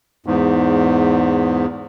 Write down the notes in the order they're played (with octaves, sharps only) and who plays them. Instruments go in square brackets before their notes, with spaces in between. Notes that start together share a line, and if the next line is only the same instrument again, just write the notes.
[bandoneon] E2 G#2